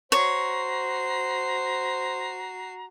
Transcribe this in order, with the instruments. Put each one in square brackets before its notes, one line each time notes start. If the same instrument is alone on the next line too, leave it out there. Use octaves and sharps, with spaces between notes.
[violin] F#4 C7 [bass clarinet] C5 [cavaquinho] C#5 [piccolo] A#5